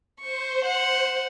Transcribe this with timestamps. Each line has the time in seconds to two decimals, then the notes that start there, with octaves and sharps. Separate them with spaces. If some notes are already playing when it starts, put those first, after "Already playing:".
0.20 C5 C#6
0.65 F#5